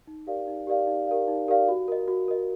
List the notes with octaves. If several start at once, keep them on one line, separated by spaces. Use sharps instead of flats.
D#4
G4 A#4 D5 F5
D#4
G4 A#4 D5 F5
D#4
G4 A#4 D5 F5
D#4
G4 A#4 D5 F5
F#4
A#4 D#5
F#4
A#4 D#5